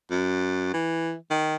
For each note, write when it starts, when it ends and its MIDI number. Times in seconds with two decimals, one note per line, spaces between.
0.11 0.71 42
0.73 1.14 52
1.31 1.56 51